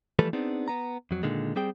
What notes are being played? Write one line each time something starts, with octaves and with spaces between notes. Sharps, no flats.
E3 F3 G3 A3 A4 B4
B3 C4 D4 D#4 G#4
B3 A#5
F2 F#3
A#2 D3 D#3 G#3
G3 C4 G#4 G5